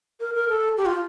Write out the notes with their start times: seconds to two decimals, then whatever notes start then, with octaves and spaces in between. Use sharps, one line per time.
0.20 A#4
0.35 A#4
0.49 A4
0.77 G4
0.86 F4